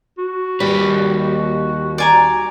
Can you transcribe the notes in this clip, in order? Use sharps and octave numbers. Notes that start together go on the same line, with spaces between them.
F#4
D#2 G3 B4
D5 G#5 A#5